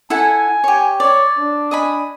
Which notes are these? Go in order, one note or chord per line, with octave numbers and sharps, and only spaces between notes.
E4 A4 F#5 G#5
G4 C#5
C#5 D5
D4
D#5 G#5 B5